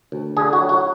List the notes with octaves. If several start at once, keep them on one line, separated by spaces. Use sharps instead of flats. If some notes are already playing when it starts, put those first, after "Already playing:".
D2
D3 G#4
F#4
F#3
F#4